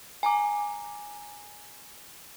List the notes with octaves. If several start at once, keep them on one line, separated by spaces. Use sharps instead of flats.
G#5 A#5 D6